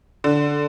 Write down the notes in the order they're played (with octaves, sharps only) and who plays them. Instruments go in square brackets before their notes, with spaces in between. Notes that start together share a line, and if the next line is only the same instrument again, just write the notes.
[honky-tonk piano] D3